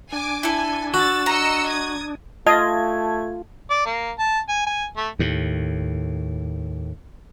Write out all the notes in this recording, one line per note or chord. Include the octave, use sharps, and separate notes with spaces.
D4 G#5 D6
E4 A4 G#5
F#4 E6 A6
D#5 A#5 E6 C#7
D#6 G#6
A3 F4 D#5 A5 G#6
D5
A#3
A5
G#5
G#5
A3
D#2 A2